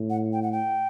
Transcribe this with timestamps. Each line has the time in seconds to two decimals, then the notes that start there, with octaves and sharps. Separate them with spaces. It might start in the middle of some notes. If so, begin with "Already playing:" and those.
Already playing: A2
0.10 F#5
0.33 G5
0.43 F#5
0.52 G5